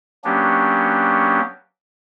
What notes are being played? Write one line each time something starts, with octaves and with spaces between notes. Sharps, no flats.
F#3 A#3 B3 C#4 D4 G4